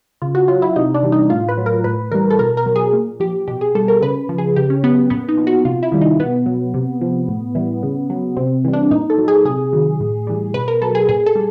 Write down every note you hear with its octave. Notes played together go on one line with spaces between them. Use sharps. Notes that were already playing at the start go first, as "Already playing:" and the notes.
C#3 F4
F#4
F#3 F4
E4
C3 D#4
D4
E3 G3
D#4
A2 F4
B4
F#3
A#4
A2 B4
E3 G3 A#4
A4
B2 A#4
A#4
F#3
G#4
A#2
F3 G4
B2 G4
G#4
G3 A4
A#4
C#3 B4
F3
G#4
C#3 G4
C#4
F#3 B3
A#2 B3
D#4
F3
F#4
C3 F4
E4
D#3 G3
D#4
B2 B3
F#3
C3
F3
A2
E3 G3
C#3
F#3
C3 C4
E3 G3
D4
A#2 D#4
A4
F#3
G#4
C3 G#4
D#3 F#3
A2
E3 G3
B2 B4
A#4
F#3 A4
G#4
A#2 G#4
A4
G3